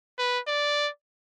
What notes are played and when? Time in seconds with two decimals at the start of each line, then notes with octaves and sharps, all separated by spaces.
0.18 B4
0.47 D5